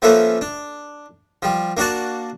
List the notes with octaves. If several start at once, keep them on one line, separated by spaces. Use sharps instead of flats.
F3 A3 A#3 C#4 A4 B4
D4
F3 G3
A#3 D4 F#4 D5 A5